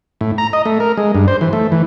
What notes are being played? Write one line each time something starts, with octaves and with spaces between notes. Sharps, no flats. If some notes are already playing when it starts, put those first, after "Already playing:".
A2
A#5
D#5
A3
A#4
G#3
G2
C5
E3
A3
E3